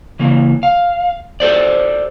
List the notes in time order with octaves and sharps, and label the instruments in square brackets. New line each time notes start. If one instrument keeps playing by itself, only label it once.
[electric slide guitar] C#3 E3 A#3
F5
G4 A4 C5 D5